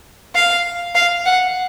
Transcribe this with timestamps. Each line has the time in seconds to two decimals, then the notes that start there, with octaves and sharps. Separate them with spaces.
0.35 F5
0.95 F5
1.26 F#5